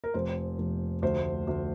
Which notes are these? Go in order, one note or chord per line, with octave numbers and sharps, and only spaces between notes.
A#4
F1 C5
F1
D2 C5
D2